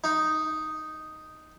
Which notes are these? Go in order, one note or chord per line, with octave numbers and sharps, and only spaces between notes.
D#4